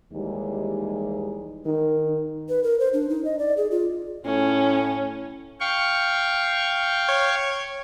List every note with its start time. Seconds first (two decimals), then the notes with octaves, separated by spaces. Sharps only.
0.12 D#2 E3 G3 G#3 D#4
1.65 D#3 D#4
2.49 B4
2.63 A#4
2.79 C5
2.93 D4
3.09 D#4
3.25 D#5
3.39 D5
3.57 G#4
3.71 F4
4.25 A2 C#4
5.60 F5 G5 C#6
7.08 C#5